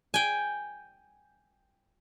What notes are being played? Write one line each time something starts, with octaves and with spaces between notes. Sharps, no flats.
G5 G#5